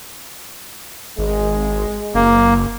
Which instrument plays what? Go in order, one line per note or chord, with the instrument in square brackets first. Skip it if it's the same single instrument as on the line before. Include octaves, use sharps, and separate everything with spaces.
[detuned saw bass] G#1 [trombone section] G#3
[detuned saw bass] F#1 [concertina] A#3